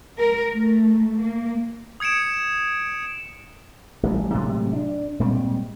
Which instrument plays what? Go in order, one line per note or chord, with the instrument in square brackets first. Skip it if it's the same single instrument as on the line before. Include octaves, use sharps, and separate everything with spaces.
[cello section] A#4
A3
A#3
[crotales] D#6 G#6 C#7 D7 E7
[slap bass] A1 G3
A2 C3 F#3 G#3
D4
A#2 G3 G#3 C4